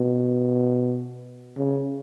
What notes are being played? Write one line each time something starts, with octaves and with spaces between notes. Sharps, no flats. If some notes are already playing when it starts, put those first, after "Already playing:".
Already playing: B2
C#3